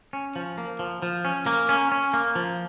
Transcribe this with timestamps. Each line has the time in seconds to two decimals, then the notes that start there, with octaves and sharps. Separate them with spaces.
0.13 C#4
0.36 F3
0.58 A#3
0.79 F3
1.02 F3
1.25 C#4
1.46 A#3
1.69 C#4
1.92 C#4
2.14 A#3
2.36 F3